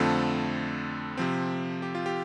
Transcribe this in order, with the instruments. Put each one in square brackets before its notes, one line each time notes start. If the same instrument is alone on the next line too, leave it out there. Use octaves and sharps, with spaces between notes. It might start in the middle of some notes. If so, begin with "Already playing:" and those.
Already playing: [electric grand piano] F2 D3 A3 C4 F4 A4
C3 F3 C4
G4
F4
G4